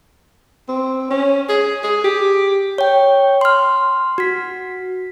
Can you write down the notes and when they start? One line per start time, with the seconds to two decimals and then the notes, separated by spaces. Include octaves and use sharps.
0.69 C4
1.11 C#4
1.49 G#4
1.84 G#4
2.04 G4
2.78 C#5 G5
3.41 C6 F6
4.18 F#4 B6